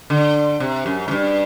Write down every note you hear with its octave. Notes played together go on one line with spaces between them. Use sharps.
D3
C3
F#2
A2
G2